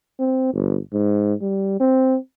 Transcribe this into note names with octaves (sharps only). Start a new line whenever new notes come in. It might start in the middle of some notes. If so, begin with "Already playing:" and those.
C4
G1
G#2
G3
C4